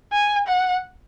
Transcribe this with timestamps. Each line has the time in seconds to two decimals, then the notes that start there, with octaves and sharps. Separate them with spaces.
0.12 G#5
0.47 F#5